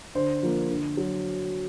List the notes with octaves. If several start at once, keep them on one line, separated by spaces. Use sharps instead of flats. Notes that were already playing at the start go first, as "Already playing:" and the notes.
D3 C5
F3 A#3
D3
F#3